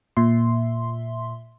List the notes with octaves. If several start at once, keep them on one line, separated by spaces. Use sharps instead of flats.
A#2 E5 C6